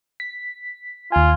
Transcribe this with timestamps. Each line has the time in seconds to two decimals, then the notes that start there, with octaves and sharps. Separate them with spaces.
0.20 B6
1.12 D#2 F4 G#5